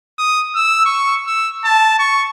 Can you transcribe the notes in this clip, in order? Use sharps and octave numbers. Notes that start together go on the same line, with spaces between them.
D#6
E6
C#6
E6
A5
C#6